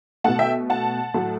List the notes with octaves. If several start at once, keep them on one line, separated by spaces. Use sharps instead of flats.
B2 A3 F#5 A5
E5 G5
F#5 A5
A2 F#3 A3